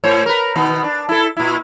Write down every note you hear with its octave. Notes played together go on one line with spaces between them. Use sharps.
A2 C5 C#5
A#4 B4
B2 D#3 B3
D4
E4 A4
A#2 E4